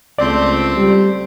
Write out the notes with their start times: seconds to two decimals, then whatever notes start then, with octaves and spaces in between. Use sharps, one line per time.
0.19 C#2 A3 C4 D5
0.76 G3